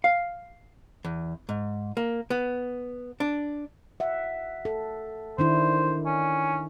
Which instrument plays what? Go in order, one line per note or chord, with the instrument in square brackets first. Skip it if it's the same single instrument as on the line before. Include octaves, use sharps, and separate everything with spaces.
[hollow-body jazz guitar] F5
E2
G#2
A#3
B3
D4
[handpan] E5 F#5
A4
[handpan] D#3 D4 E4 [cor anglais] C5
[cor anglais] C#4